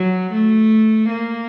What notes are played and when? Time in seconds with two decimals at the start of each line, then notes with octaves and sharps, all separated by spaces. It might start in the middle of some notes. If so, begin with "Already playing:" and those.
Already playing: F#3
0.32 A3
1.10 A#3